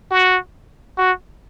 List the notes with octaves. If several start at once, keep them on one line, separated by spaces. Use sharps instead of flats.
F#4
F#4